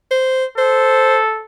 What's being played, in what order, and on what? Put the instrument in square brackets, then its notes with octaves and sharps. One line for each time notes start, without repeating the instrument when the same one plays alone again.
[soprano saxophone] C5
[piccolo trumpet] A4 [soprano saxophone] C5